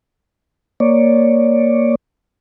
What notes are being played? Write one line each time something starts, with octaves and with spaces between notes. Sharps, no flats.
A#3 C#5 D5